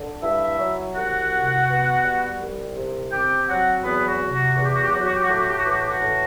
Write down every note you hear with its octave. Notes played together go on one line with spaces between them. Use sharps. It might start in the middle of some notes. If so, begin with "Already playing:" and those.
Already playing: D3
G2 E4 E5
F#3
C2 F#4 F#5
C3
B3
G3
C2
C3
C4 G4 G5
F#3 F#4 F#5
E2 B3 B4
F#4
C3
F#4
E2 F#4
G4
F#4
G4
F#4
F#3
G4
F#4
G4
F#4
A2 G4
F#4
G4
F#4
E3 G4
F#4
G4
F#4
A2